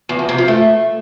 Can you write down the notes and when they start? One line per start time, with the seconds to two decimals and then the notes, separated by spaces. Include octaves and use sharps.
0.09 E2
0.19 F2
0.29 C3
0.38 F3
0.48 A3